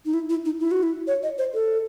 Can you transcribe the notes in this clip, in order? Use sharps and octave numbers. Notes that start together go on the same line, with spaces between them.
D#4
E4
E4
D#4
E4
F#4
E4
C#5
D#5
C5
A4